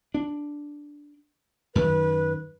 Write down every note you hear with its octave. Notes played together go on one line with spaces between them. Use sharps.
D4
F#2 D#3 B4